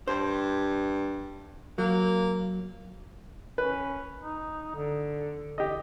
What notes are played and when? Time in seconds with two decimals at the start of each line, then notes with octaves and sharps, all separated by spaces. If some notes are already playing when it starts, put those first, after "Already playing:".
0.08 G2 C5
1.78 F#3 A#3
3.58 C#4 B4
4.20 D#4
4.76 D3
5.58 D3 G4 D#5